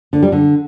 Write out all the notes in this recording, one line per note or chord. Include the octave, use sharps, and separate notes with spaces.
D3
G3
D3